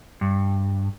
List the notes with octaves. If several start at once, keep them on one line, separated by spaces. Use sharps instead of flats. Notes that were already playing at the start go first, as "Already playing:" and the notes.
G2